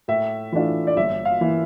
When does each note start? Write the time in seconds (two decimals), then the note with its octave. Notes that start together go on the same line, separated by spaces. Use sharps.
0.08 A2 E5
0.52 E3 A3 D4 F4
0.87 D5
0.97 G1 E5
1.25 F5
1.41 E3 A#3